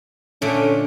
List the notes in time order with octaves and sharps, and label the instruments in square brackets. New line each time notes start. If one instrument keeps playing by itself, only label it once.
[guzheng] A#2 D3 A3 [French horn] C#4